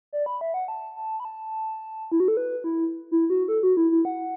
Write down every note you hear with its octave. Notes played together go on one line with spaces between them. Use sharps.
D5
B5
E5
F#5
A5
A5
B5
A5
E4
F#4
A4
B4
E4
E4
F#4
A4
F#4
E4
E4
F#5